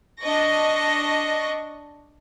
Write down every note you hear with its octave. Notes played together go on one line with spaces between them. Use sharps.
D4 D#5 C#6 A#6